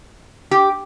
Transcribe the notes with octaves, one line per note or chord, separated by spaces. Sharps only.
G4